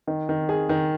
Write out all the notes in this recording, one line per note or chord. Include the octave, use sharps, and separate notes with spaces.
D#3
D#3
G#4
D#3